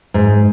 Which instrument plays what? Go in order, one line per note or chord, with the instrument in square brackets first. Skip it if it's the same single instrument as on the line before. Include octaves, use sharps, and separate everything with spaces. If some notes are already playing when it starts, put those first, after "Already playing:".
[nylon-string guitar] G#2